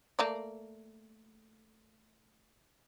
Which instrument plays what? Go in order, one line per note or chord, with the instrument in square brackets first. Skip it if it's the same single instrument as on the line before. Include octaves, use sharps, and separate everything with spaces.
[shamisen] A3 A#3 D5